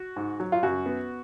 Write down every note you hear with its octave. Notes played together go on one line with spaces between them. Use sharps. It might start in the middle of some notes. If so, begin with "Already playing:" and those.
Already playing: F#4
G#2
F#3
F4
F#2 F#4
B3